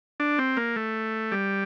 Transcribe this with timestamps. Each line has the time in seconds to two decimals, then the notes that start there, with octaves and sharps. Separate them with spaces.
0.20 D4
0.39 C4
0.57 A#3
0.76 A3
1.32 G3